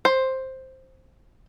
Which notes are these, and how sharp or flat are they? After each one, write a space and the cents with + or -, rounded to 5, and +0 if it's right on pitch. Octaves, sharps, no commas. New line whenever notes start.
C5 +5